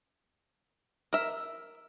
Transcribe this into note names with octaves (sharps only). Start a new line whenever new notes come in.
A#4 E5